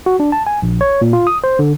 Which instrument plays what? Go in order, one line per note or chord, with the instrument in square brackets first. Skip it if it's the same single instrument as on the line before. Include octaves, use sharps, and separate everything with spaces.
[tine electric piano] F#4
D4
A5
G#5
A#1
C#5
A#2
F4
D#6
C5
D3